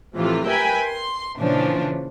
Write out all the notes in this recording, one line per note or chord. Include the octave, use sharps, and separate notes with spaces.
A2 C3 E3 F3 A3 F4
A#4 B4 E5 G5 G#5 B5
C6
A#2 C#3 E3 F3 C#4 D4